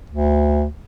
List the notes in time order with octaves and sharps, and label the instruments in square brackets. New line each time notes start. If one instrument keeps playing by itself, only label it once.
[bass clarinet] D2